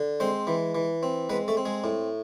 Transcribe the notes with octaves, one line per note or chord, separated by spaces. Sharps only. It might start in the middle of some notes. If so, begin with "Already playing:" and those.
Already playing: D3
G#3 C4 C5
E3
E3
C4
G#3 B3 B4
A3 A4
C4
G#3 G#4
A2